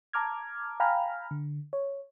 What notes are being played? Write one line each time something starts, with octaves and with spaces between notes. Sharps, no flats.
A5 A#5 D6 F6 G#6
F5 G5 G#5 A#5 B5 F6
D3
C#5